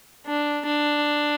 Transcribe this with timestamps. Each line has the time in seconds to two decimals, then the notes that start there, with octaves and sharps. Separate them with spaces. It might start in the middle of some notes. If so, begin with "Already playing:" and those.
0.27 D4
0.65 D4